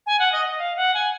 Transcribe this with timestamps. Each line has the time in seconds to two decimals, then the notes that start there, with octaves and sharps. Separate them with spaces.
0.06 G#5
0.19 F#5
0.32 D#5
0.46 D#5
0.58 F5
0.77 F#5
0.94 G#5